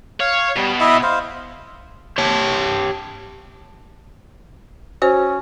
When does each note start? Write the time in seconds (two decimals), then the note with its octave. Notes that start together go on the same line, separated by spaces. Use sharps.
0.20 C#5 F5
0.57 B2 G3
0.80 E4 D#5 E5
1.03 C5 F5
2.18 G4 C#5 G5 A5
5.02 C#4 F#4 C5